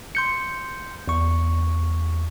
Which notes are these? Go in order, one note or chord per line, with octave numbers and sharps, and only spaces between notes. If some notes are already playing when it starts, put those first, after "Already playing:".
C6 G6 C#7
E2 C#6